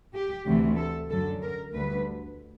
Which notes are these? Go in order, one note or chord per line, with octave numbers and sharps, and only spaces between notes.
G4
D2 C3 E3 A3
A4
F#2 D3 F#3 A4
A#4
D2 D3 G3 B4